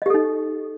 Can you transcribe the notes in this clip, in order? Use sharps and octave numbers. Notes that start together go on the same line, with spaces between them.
D#4 G4 A4 D#5